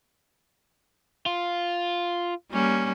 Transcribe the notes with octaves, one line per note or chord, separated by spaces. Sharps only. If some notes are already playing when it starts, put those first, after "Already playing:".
F4
G3 A#3 C#4